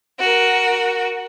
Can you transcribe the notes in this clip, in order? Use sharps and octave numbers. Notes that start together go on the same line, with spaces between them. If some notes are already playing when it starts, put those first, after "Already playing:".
F#4 A#4